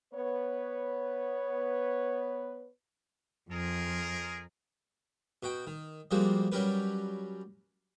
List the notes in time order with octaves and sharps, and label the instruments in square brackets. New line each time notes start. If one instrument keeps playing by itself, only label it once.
[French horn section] B3 B4 C#5
[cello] F2 [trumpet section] F4 G#4 A#4
[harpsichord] B2 F#4 G5
D#3
F3 G3 G#3 A#3 C4 F#4
F#3 G3 C#4 G4 A#4 B4